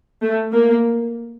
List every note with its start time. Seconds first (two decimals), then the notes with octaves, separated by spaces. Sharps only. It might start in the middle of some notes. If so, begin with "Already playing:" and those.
0.22 A3
0.53 A#3